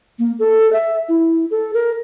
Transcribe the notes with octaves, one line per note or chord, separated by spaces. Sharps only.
A#3
A4
E5
E4
A4
A#4